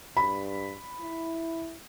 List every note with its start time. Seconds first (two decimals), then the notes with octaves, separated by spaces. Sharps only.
0.17 G2 B5
1.01 E4